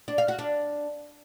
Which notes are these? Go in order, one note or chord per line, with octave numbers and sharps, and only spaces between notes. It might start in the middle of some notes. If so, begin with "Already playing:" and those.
D4
F5
F#4
D4